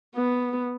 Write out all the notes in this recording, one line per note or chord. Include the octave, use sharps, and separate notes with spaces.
B3